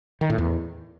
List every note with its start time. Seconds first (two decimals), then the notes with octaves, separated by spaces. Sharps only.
0.21 D#3
0.30 A2
0.38 E2